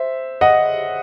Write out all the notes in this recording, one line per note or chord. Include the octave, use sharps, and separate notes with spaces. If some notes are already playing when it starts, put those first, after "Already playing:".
Already playing: C5 E5
D#5 F#5